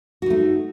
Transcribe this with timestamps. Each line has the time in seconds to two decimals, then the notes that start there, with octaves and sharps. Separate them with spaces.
0.22 F#4
0.26 D#4
0.30 A3